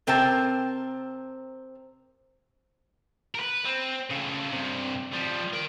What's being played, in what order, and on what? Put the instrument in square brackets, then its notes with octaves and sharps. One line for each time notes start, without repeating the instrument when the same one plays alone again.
[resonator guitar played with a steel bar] C3 C4 A#4 G5 A5
[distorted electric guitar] A#4 B4
C4
C#3 A3
G2 C3
F3 G3
A#4 G5